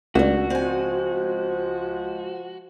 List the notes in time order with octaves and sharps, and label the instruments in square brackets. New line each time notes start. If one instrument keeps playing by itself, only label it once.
[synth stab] C#2 [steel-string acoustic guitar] A3 D4 [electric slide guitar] F#4
[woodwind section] F3 G#3 [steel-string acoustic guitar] C4 G#5